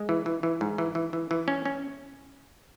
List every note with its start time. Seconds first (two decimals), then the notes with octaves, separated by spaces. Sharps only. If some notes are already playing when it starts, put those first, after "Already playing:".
Already playing: G#3
0.09 E3
0.26 E3
0.43 E3
0.61 G#2
0.78 E3
0.95 E3
1.13 E3
1.31 E3
1.48 C#4
1.65 C#4